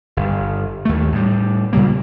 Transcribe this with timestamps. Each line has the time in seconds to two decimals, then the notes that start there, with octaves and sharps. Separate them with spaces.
0.17 G1
0.85 D#2 A3
1.12 A2 G3
1.73 A#2 C#3 G3 A#3